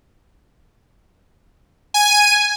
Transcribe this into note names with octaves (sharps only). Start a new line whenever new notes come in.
G#5 D#7